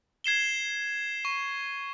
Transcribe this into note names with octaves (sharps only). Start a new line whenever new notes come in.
G#6 C7 E7 G7
C#6